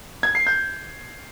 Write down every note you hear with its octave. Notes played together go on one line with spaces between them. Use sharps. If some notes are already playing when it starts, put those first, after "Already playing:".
G#6
C7
G6